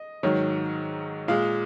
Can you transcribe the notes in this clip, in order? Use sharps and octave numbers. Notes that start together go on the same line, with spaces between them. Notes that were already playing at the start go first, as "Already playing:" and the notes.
Already playing: D#5
G#2 D#3 F#3
A#2 G#3 F5